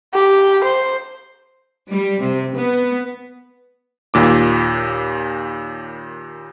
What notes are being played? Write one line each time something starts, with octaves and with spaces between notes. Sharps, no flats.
G4
C5
G3
C3
B3
D#2 A#2 D6